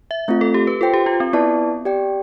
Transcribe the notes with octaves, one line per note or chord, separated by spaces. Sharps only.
E5
A3 C4 F4
A4
G4
B4
F4 A4 C5 G5
G4
F4
C4
B3 E4 B4 D5 A5
G4 D5 G5